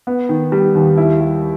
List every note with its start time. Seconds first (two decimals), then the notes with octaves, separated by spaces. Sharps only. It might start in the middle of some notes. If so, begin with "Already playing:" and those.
0.07 B3
0.29 D#3
0.52 G3
0.75 D#2
0.98 E4
1.20 G3